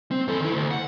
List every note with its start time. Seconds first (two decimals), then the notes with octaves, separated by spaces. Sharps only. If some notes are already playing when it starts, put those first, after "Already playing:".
0.11 C4
0.28 E3 A4
0.40 D#3 E4
0.53 D2
0.71 F#5